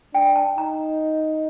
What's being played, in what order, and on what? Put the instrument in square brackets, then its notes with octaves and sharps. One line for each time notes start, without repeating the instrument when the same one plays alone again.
[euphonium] D4 [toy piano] G5
[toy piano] A5
[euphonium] D#4 [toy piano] A#5